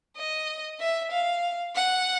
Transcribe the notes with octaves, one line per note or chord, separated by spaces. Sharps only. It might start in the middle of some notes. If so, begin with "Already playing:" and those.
D#5
E5
F5
F#5